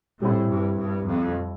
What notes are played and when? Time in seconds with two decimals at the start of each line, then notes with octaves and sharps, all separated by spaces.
0.21 A2 G3 C4 E4
0.50 G2
0.78 G2
1.07 F2